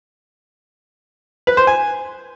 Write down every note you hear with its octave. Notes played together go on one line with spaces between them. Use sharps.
B4
C5
G#5